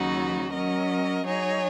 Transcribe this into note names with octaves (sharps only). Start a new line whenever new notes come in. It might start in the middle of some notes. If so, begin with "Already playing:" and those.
Already playing: D#2 C#3 F#3 D#4 F#4
F#3 C#4 A#4 D#5
F#3 D#4 G#4 C#5